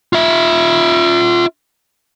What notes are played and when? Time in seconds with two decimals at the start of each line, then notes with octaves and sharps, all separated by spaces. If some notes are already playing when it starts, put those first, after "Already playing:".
0.13 F4 E5